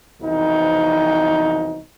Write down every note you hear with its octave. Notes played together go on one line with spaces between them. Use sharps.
C2 F2 B2 E3 F3 D#4